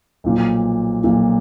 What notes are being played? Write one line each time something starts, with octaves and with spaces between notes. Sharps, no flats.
B1 A#2 F3
B1 A#2 F3